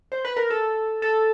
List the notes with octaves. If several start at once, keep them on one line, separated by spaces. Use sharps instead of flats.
C5
B4
A#4
A4
A4